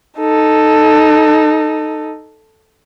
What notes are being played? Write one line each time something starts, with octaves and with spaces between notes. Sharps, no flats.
D#4 A4